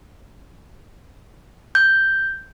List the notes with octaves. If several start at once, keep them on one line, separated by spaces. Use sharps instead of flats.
G6